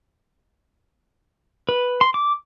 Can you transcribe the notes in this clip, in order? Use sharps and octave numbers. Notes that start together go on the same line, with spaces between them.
B4
C6
D6